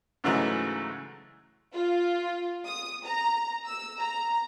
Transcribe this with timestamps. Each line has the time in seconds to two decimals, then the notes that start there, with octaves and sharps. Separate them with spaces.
0.24 G#2 C#3 E3 F#3 G#3 A3
1.75 F4
2.66 D#6
3.03 A#5
3.66 E6
3.99 A#5